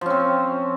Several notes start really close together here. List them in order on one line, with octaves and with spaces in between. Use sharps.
F3 C#4 C4